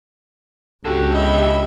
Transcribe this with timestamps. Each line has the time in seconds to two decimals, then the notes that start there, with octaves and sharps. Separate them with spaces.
0.85 C#2 D3 F#4 G4 A4
1.14 D#5 E5 B5